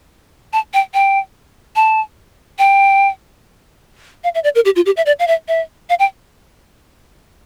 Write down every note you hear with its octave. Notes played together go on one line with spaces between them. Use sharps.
A5
G5
G5
A5
G5
F5
E5
D5
A#4
G4
F4
G4
E5
D5
F5
E5
E5
F5
G5